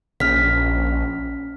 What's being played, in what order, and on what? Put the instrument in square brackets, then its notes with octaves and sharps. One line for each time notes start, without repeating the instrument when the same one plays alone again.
[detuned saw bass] A#1 [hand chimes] C#4 F6 B6